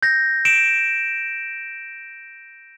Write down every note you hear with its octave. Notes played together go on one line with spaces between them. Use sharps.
G6 A#6
D7 E7